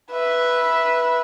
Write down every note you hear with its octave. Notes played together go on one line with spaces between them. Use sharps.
B4 E5